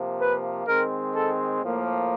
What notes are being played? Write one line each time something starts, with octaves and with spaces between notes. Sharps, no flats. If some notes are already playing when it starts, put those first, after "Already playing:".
Already playing: C3 F3 A#3
B4
D#3 G#3 C4 A#4
A4
A2 F3 A#3